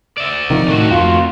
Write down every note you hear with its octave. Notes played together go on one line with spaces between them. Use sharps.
D5 E5
C3 D#3 F3
A2 A3 F#4
F2 F4